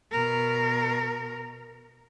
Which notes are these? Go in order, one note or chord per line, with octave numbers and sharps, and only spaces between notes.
B2 A#4